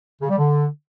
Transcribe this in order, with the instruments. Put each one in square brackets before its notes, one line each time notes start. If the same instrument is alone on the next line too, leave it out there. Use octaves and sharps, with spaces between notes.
[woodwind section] C#3
G3
D3